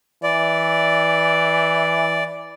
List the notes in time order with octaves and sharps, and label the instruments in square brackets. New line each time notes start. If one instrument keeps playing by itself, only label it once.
[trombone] E3 [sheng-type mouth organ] D5